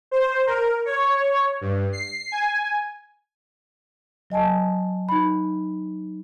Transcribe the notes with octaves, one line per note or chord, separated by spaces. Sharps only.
C5
A#4
C#5
G2
C7
G#5
F#3 D#5 G#5 A5
D#4 B5